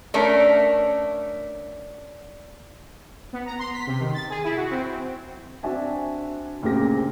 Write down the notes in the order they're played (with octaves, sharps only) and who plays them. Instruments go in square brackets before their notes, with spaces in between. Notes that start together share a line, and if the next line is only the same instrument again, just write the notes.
[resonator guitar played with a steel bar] A3 C#4 D4 A#4
[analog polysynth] B3
A#5
C6
B6
C3
D#3
A6
G#4
E4
F#4
C4
[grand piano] C4 D4 F#4 E5 G#5 A5
D2 A#2 C#3 C4 G4 A#6